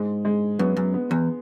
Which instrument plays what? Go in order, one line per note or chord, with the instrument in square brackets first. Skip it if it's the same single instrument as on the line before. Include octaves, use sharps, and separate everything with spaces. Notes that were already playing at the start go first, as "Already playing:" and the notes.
Already playing: [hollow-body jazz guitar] G#2 [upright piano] G#3
[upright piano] G#3
[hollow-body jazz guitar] F#2 [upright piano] B3
[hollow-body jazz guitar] F#2
[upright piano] B3
[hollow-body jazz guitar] E2